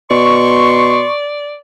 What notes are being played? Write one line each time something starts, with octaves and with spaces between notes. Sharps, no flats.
B2 D5 C6 C#6